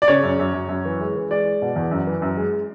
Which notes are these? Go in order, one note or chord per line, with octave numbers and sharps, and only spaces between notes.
D5
C#3 C#5
F#2
F#2
F#2
F#2
E3
G#3
E3
G#3 D5
G#3
B2
E2
F#2
E3
F#2
G#3